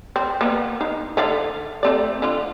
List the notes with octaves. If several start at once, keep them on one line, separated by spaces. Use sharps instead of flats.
C4
A#3 B3
D#4 F5
D3 D5 F5
A3 C4 D5
D3 F4